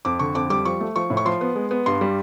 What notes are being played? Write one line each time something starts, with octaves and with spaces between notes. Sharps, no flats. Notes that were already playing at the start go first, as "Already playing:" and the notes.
F2 D6
D3 C#6
F2 D6
G3 D6
F3 C#6
A3
F3 C#6
A2
C#6
F3 C6
B3
G#3
B3
G2 C6
G3